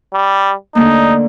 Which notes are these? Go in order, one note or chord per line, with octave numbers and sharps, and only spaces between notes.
G3
D3 A3 A#3 D#4